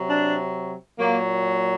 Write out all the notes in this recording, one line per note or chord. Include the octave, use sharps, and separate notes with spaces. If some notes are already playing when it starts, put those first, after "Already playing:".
Already playing: C3 F#3
D4
A#2 F#3 A#3